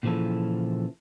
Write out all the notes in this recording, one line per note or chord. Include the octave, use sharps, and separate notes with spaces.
A#2 C#3 E3 F3 E4 A4